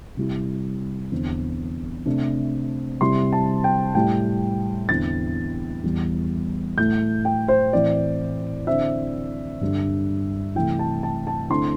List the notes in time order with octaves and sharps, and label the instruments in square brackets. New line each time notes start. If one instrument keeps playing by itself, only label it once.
[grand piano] C3 G3 E4
E2 D3 C4
C3 A3 D4
C3 G3 E4 C6
A5
G5
A2 G3 E4 G5
E2 D3 C4 E4 A6
E2 E3 G3
A2 A3 E4 G6
G5
C5
A2 E3 C4 D5
D3 C4 E4 E5
G2 D3 G3
C3 E3 A3 E4 G5
A5
A5
A5
D3 A3 C4 E4 C6